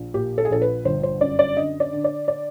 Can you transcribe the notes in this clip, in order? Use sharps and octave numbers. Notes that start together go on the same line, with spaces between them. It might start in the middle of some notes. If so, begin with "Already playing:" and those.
Already playing: A#1
A#2 G4
A4
G#4
A#1 A4
B4
G1 C5
C5
F#2 D5
D5
D3 D#5
D5
D3
D5
D5